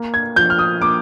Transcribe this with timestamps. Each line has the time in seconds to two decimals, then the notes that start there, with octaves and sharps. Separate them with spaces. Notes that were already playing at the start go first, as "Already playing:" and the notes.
Already playing: A#3
0.14 G#6
0.36 F3 G6
0.50 F6
0.59 D#6
0.81 A#3 D6